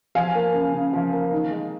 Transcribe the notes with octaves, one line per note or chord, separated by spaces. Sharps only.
F3 F5 G#5
A#3
C#3
C#3
F3
A#3
D#3
G#3